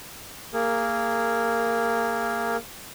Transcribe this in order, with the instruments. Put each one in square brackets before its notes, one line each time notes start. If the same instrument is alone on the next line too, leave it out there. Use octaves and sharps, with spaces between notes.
[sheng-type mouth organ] A#3 G#4 A#4